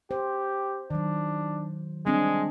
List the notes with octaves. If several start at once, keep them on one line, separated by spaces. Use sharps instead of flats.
G4 C5
D#3 F#3 D4
G3 G#3 C4 D4